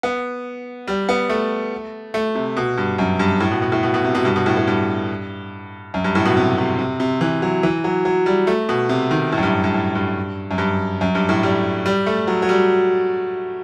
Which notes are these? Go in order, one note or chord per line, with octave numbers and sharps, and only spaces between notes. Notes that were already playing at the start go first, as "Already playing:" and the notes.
B3
G3
B3
A3
A3
C3
B2
G2
F#2
G2
A2
B2
B2
A2
B2
B2
C3
B2
G2
B2
A2
A2
G2
F#2
G2
A2
B2
C3
C3
C3
C3
E3
F#3
E3
F#3
F#3
G3
A3
B2
C3
D#3
A2
F#2
G2
G2
A2
G2
F#2
G2
F#2
G2
A2
G3
G3
A3
F#3
F#3
G3